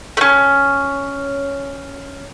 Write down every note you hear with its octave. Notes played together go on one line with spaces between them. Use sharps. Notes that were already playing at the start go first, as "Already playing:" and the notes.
A3 C#4